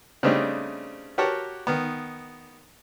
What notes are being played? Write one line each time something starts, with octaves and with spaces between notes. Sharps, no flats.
C#3 G3 A3 C4 D4 D#4
F#4 G4 A#4 C#5 F#5 A5
D#3 B3